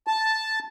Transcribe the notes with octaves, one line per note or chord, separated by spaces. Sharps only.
A5